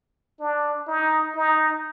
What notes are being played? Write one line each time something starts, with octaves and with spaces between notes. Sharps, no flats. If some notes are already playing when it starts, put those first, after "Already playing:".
D4
D#4
D#4